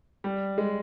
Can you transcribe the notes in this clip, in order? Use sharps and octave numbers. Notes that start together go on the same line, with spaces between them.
G3
G#3